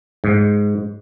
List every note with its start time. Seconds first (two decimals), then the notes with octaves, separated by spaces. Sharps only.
0.24 G#2